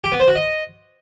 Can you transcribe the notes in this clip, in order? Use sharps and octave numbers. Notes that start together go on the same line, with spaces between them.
G4
B3
C5
F#4
D#5